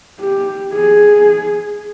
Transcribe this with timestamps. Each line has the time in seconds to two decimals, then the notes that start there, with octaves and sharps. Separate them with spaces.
0.20 G4
0.73 G#4